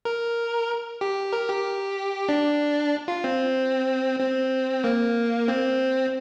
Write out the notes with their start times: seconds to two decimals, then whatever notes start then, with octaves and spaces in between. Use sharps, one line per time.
0.05 A#4
1.01 G4
1.33 A#4
1.49 G4
2.29 D4
3.08 F4
3.24 C4
4.20 C4
4.84 A#3
5.48 C4